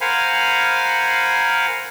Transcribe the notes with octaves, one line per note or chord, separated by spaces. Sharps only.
A#4 C5 F5 F#5 G#5 B5